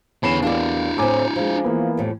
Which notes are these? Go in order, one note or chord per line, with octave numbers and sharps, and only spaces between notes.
E2 D3 C#4 B5 C7 E7
A#3 D4 E4 G4 D5
A2 C4 G#5 A#5 D6
F3 G#3
E3 A#3 B3
F2 A2 G3